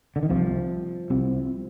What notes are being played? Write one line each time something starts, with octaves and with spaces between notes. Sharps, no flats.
D3
D#3
C2 C3 F3
C2 C3